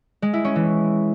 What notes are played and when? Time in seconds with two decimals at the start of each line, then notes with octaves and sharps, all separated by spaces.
0.22 G#3
0.33 E4
0.45 C#4
0.56 E3